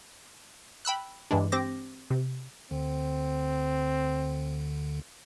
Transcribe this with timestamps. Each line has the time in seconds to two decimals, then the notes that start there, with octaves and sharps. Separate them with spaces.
0.85 G5 B5 E6 F#6
1.31 G2 E3 G#3 D4
1.52 C4 G4 C5 D6 A#6
2.10 C3
2.71 D2 D3 C4